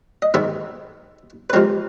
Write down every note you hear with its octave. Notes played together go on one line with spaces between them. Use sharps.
D#5
G#2 D#3 G#3 B3 D#4 E5
B4
C3 F3 G#3 C4 A#4